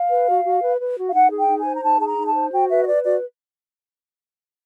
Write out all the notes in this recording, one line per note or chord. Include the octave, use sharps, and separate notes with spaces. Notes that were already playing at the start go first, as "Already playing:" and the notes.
Already playing: F5
B4
F#4
F#4
B4
B4
F#4
F5
D#4 F#5
G#4
G5
D#4
G#5
C5
A#5
D#4 A5
G#4 A5
A#5
D#4
A5
C5
F#4 G5
B4 E5
D#5
B4 D5
F#4 D5